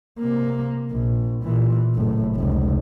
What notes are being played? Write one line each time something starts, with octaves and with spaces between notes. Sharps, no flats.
C3 A#3
A#1
A#2 E3
F#1 A2
F1 C#2